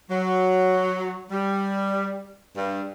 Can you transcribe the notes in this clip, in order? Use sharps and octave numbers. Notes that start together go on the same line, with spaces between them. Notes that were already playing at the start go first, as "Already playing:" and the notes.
F#3
G3
G2